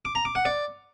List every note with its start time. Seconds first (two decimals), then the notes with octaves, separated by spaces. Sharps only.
0.05 D6
0.15 A#5
0.25 D6
0.35 F#5
0.45 D5